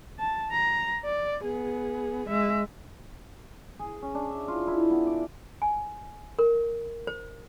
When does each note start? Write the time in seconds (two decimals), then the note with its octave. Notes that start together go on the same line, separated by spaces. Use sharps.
0.19 A5
0.52 A#5
1.05 D5
1.45 B3 G#4
2.28 G#3 E5
3.79 G#4
4.02 C#4
4.15 D4
4.30 E5
4.48 F4
4.67 E4
4.91 B3
5.07 D5
5.62 G#5
6.39 A#4
7.07 C5